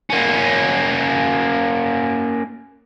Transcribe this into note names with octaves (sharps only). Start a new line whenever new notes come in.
A#3 C#4